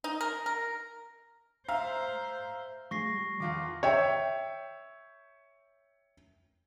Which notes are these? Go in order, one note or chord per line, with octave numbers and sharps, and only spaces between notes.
D#4
A#4
A#4
C5 E5 F5 A#5
F3 A3 G#4 C#6 A#6 C7
G3
E2 D#3 F3 F4 D6
C#5 E5 G5